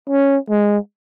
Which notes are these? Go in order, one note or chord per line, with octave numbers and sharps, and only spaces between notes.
C#4
G#3